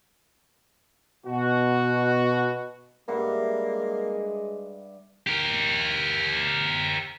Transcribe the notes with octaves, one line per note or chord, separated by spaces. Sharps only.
B2 F#4
G2 G#3 A#3 E5 F#5
G4 A#4